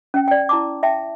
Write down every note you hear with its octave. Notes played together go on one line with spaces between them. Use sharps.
C#4 G5
D5 G5
E4 A5 D6
E5 G5 A5